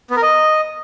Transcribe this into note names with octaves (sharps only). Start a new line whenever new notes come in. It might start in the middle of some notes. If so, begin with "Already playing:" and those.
B3
A#4
D#5